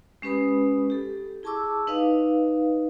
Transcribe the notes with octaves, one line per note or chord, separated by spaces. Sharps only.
G#3 C#4 G4 B4 B5 D#6
G4 A4
E4 G#4 A5 C#6 D6 E6
D#4 B4 D#5 F5